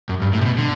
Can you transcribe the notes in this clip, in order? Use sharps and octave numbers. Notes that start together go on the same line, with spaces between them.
F#2
G2
A2
C3
B2
D3